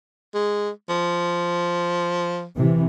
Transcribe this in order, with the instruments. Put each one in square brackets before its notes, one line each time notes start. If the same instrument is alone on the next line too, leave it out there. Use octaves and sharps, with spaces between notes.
[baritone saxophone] G#3
F3
[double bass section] C3 E3